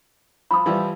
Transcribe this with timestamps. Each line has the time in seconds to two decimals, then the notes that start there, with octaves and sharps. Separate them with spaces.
0.51 F3 B5 D#6
0.66 E3 F3 G3